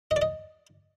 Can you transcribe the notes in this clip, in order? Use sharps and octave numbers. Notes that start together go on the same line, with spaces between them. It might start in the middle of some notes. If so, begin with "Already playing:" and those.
D#5
D5
D#5